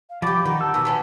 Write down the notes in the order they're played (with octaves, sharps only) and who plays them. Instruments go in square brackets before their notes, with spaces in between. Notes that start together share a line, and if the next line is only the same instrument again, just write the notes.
[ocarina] F5
[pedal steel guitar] F3 D5 [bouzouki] F#4 G4 [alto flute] B5 [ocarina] D6
[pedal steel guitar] D#3 [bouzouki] D#4 [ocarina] F#5
[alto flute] A5 [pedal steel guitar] E6
[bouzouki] B2 B3 [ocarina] G#5
[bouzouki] B3 C#4 F#4